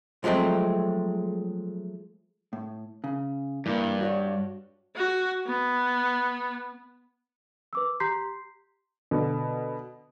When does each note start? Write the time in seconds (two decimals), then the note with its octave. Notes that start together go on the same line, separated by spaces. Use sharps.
0.24 F3 F#3 G#3 A3 C4
2.53 A2
3.04 C#3
3.66 G2 E3 A#3
4.01 F#4 C#5 D5
4.96 F#4
5.47 B3
7.73 B4 D6 E6
8.00 G4 A#5 C6 G6 B6 C7
9.11 B2 D3